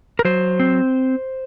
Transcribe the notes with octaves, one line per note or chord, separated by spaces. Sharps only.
A#4
F#3 C5
C4